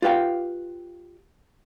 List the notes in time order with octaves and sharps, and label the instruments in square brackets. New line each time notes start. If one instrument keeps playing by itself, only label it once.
[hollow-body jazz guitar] F4 G4 B4 F5 G5